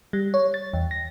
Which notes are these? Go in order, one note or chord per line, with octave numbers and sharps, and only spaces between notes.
G3
C#5
A6
E2
A#6